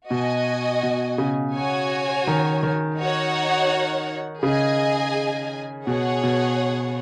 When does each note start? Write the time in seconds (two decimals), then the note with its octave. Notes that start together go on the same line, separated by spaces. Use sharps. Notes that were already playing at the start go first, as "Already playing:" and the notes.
0.10 B2 F#4 D#5 G#5
0.83 B2
1.18 C#3
1.55 F#4 C#5 G#5
2.27 D#3
2.63 D#3
2.99 D#4 F#4 C#5 F#5
4.43 C#3 G#4 D#5 G#5
5.87 B2 G#4 C#5 F#5
6.23 B2